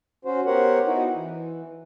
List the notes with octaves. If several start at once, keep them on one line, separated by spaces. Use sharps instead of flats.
C#4 F#4 C5
B3 G4 A#4 C5 C#5 F#5
B3 D#4 E4 F#4
E3